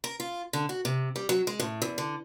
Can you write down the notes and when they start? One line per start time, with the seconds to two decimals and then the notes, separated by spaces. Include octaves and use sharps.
0.04 A#4
0.20 F4
0.53 D3
0.69 F#4
0.85 C3
1.16 G3
1.29 F#3
1.47 G#3
1.60 A2
1.82 E2
1.98 D3